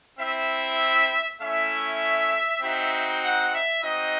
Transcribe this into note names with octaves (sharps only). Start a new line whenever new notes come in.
C4 E4 E5
A3 C#4 E4 E5
C4 D#4 F#4
F#5
E5
C4 D#4 F#4 D#5